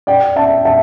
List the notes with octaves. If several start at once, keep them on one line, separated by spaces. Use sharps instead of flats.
D5 G5
E5 A5
E5 A5